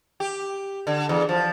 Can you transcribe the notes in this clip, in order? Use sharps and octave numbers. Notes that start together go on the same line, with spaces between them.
G4
D3
E2
F3